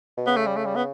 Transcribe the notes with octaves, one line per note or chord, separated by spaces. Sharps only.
B2
C#3 B3
A3
G3
A3
G3
B3